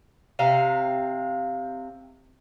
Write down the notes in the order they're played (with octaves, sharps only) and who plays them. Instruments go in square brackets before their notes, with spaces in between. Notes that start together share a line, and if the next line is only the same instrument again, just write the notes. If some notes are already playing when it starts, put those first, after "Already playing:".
[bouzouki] C3 F5 A#5